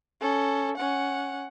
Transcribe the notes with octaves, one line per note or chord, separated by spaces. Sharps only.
C#4 A4
C#4 F#5